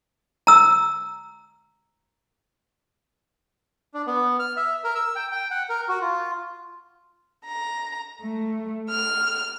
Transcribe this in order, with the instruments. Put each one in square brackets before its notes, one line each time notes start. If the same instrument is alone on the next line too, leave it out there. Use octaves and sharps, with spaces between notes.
[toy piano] A#5 E6
[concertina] D4
B3
F6
E5
A#4
E6
G5
G5
F#5
A#4
F#4
F4
[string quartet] A#5
A3
F6